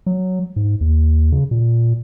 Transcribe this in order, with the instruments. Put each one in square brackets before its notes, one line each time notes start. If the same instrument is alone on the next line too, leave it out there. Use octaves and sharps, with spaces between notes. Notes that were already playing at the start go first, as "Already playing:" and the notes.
[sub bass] F#3
G#2
D#2
C#3
A#2